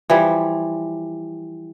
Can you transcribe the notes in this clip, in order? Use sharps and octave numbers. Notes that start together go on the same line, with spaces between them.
E3 F3 G3